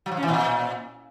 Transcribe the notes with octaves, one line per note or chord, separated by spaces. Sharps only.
F#3
F3
C#4
E3
A#2